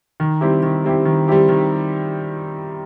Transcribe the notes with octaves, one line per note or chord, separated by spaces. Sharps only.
D#3
G3 C4 E4 G4
D#3
G3 C4 E4 G4
D#3
G3 C4 E4 G4
D#3